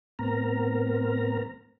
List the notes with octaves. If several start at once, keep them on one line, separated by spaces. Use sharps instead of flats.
A2 B3 C4 A#4 A#5